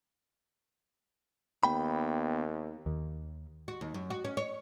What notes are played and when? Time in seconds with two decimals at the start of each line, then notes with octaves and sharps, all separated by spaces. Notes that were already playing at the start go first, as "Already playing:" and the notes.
1.63 D#2 B3 G5 B5
2.86 D#2
3.68 F#4
3.81 D#2
3.94 F#2
4.10 F#4
4.25 C#4
4.37 C#5